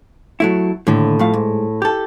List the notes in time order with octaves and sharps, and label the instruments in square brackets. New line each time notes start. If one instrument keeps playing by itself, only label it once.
[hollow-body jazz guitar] F#3 A3 E4
[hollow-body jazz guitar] D#2 D3 [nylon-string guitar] A2
[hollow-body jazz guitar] F2 A3 F5
G#2
G4 A4